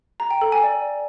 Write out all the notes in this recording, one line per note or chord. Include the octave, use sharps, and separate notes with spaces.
A#5
G5
A4
G#5
D5